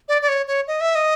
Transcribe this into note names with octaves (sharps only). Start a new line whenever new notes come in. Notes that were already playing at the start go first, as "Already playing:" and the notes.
D5
D5
C#5
C#5
D#5
E5
D#5